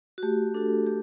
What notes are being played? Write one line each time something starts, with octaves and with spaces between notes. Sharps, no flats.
F#4
A3 G4
D4 F#4 A4
A3 G4